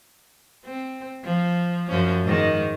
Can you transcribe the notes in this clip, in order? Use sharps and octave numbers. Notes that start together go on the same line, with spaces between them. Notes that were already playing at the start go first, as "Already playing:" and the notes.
C4
F3
F#2 F3 C#4
G#2 D#3